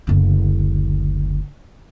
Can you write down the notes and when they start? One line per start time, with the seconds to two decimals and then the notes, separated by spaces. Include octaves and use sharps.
0.07 F#1 D2